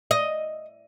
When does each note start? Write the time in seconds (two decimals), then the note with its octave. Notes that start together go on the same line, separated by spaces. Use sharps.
0.11 D#5